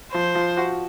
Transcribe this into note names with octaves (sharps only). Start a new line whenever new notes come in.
F3 C5
F3
F#4